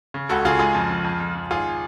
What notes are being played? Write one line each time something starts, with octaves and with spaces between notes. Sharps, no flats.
C#3
C#2 F#4 A4
C#3 F4 G#4
G#3 F4 G#4
F2
F2
F2
F2
F2
G#1 F4 G#4